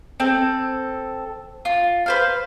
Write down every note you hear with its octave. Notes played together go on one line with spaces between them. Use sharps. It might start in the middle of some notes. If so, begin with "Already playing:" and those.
C4 A4
F4
B4 C5 F5